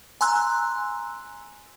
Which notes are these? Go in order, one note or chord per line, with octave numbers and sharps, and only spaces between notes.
G#5 A#5 C6 E6 F#6